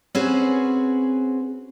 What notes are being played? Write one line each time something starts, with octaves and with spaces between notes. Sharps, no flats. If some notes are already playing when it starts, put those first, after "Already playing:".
C4 C#4 F#4 G#4 B4